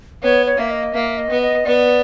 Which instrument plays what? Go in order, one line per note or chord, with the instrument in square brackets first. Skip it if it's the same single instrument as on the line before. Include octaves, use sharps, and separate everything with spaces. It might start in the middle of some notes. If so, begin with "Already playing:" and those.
[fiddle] B3 [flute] C#5
[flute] C#5
[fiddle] A#3 [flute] E5
[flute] D#5
[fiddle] A#3 [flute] E5
[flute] D#5
[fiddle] B3
[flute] D#5
[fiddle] B3 [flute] D5